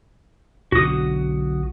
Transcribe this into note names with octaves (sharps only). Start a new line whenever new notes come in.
B1 D3 F#4 D#6